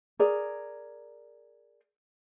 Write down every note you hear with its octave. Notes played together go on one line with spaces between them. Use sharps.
G#4 A#4 D5